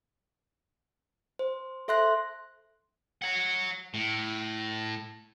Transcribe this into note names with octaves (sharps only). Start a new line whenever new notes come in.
C5
A4 E5 C6 F#6 A#6
C#5 F#5
A2